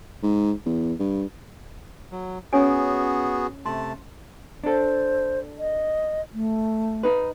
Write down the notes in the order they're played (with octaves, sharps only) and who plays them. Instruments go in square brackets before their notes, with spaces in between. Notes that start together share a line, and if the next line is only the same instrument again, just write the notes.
[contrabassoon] G#2
E2
G2
[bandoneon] F#3
[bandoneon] B3 F#4 G#4 [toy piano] C#4 C#5 G#5
[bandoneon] C3 A3 A5 [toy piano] C6
[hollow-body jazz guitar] D4 A4 [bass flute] C5
[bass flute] D#5
A3
[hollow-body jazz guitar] D#4 B4